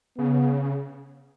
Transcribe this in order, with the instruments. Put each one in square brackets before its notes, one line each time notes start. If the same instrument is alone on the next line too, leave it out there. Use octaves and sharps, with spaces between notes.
[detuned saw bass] C#3 [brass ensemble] B3